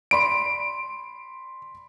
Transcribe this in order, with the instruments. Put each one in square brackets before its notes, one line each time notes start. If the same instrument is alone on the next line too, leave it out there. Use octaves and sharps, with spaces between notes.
[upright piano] D5 B5 C6 [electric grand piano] D7